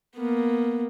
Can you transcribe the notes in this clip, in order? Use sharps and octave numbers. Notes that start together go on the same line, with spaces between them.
A#3 B3